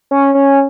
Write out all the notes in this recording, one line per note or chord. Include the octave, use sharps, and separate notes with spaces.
C#4
C#4